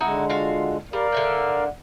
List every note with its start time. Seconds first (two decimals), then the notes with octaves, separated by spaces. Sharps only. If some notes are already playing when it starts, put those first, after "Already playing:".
0.01 D3 G#3 D#4 E4 F#4
0.30 F4 F#4 F5
0.93 G3 A#4 D5 F5
1.12 D3 E5 G5